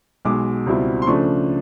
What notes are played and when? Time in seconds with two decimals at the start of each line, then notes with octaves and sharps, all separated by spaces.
0.25 B1 B2 G#3 D6
0.66 C#2 B2 G3 C4 E4
1.02 C6
1.07 C#3 F3 A3 D4 C#6